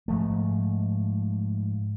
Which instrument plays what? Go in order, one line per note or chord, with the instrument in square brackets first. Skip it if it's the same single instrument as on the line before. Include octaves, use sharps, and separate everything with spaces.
[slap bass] G#2 F3 A3